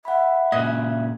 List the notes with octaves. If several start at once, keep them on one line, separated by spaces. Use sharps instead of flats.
E5 F#5 B5
A#2 C#3 D#5 F#6 G#6